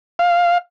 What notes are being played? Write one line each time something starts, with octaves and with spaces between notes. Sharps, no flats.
F5